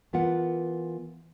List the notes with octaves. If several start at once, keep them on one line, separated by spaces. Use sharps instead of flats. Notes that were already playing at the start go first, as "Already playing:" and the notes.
E3 B3 F4 A#4 F#5